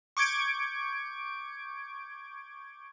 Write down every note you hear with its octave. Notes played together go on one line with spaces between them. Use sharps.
C#6 D6 G6 G#6 D7